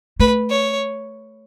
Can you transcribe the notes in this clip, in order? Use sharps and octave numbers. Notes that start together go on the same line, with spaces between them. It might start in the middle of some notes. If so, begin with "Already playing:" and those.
A3 B4
C#5